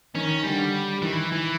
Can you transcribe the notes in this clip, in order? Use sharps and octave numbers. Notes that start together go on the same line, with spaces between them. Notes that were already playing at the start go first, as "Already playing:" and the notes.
D#3 C#4
D3 G3
D#3 E3
E3